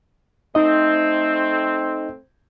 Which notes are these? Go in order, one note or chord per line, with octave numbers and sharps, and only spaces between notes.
A3 C4 D#4 D#5